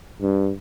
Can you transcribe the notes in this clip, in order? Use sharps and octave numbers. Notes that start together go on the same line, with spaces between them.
G2